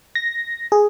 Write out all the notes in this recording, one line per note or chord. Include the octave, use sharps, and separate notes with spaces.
A#6
G#4